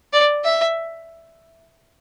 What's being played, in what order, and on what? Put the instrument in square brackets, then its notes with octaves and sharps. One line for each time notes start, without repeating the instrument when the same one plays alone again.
[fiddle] D5
E5